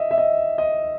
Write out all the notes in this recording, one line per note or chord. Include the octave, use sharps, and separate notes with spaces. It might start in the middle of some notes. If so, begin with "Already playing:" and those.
Already playing: D#5 E5
E5
D#5
D#5